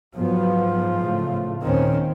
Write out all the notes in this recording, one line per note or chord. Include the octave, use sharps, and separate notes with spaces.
G#2 F3 F#3 B3 F4
A2 C#3 A3
D#2 A#2 D#3 C4 C#4